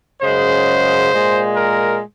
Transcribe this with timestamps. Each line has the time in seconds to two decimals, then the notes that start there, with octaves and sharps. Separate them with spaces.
0.22 F#2 C#3 G#3 C5
1.11 A#2 G#3
1.56 A#4